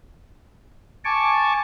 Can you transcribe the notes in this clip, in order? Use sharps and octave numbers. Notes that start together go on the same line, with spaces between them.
G#5 A5 C#6 D6